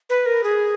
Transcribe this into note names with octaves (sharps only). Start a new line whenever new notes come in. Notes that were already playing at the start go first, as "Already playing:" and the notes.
B4
A#4
G#4